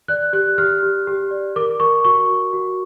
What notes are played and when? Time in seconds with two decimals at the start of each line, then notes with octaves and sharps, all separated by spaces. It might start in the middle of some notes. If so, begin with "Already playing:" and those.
0.08 D5 F#6
0.33 G4 F#6
0.58 G4 F6
0.83 G4
1.07 G4
1.31 D5
1.56 A#4 D6
1.80 A#4 C#6
2.05 F#4 C#6
2.30 F#4
2.53 F#4